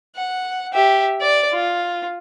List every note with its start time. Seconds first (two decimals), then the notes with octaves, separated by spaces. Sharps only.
0.16 F#5
0.73 G4 E5
1.21 D5
1.53 F4